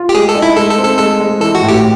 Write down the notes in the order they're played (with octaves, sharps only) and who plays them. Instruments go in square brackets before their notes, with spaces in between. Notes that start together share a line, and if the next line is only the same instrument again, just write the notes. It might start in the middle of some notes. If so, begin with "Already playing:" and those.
Already playing: [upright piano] F4
[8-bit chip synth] G4
[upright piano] G#3 [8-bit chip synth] G#4
[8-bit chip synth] A4
[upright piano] D#4
[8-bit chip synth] E4
[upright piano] G#3 [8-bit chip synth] A4
[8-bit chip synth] A4
[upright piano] C4
[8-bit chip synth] A4
[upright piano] G#3 [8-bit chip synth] A4
[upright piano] G#3
[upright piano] E3 [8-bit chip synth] A4
[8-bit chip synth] F#4
[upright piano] A2
[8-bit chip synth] G4